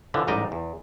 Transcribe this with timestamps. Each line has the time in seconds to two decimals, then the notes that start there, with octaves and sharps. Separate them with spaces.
0.14 D3 E3 F3
0.27 A1 G#2 G3 D#5 G5 A#5
0.52 E2